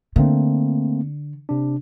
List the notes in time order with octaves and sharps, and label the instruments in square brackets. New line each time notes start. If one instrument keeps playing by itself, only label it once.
[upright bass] D3 [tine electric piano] A3 A#3 C4
[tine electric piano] C3 D4